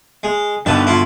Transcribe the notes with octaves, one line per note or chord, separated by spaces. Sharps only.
G#3
G2 B2 D3 D#3 B4 A5
E4 F4